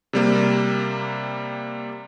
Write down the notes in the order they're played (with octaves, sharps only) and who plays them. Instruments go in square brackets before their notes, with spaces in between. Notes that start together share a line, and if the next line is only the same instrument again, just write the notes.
[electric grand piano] C3 G3 A#3